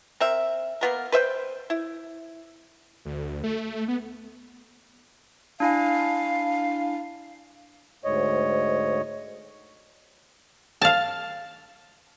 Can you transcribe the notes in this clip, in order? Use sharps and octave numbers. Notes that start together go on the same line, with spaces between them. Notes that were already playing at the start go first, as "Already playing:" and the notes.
C4 A#4 E5
A#3 B3 A#4
B4 C5 E5 G5
E4
D2
A3
B3
D4 E4 F5 G#5
D2 G#2 C#5 D#5
F5 A5